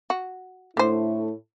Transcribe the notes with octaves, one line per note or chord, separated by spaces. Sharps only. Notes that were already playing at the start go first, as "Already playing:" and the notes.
F#4
A2 D3 A3 E4 C5